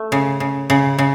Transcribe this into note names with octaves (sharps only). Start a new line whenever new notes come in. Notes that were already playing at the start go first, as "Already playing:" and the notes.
Already playing: A3
C#3
C#3
C#3
C#3